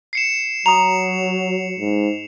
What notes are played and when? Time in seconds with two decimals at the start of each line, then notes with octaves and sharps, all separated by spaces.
0.13 C7 C#7 E7
0.66 F#3 A#5 D#6 F7
1.79 G#2